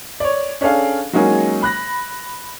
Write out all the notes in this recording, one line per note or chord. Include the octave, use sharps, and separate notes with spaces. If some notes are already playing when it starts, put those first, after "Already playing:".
C#5 D5
C#4 D4 G#4 A4 F5
F#3 G#3 A#3 C#4 D#4 G#4
B5 F#6 A#6